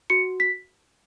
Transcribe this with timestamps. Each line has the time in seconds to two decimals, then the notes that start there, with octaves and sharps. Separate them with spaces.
0.10 F#4 C#7
0.40 B6